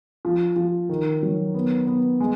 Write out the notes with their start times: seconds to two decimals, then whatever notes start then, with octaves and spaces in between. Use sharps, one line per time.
0.25 F3
0.56 F3
0.89 D#3
1.23 F#3
1.54 B3
1.87 B3
2.20 G#3